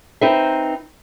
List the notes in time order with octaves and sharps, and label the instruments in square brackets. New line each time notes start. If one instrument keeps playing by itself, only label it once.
[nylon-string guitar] C4 D#4 B4 C5 E5